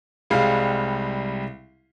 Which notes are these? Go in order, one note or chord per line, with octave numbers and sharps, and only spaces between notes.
C2 G3 G#3 F5